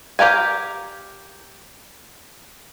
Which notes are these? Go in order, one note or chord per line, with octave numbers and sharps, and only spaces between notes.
G4 A#4 F5 G#5